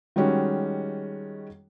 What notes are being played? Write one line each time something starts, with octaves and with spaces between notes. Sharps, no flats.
D#3 G3 G#3 C#4 F#4